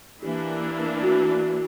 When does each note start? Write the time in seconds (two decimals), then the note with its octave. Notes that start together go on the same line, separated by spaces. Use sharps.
0.22 E3 A#3 D4 G4
1.03 F#4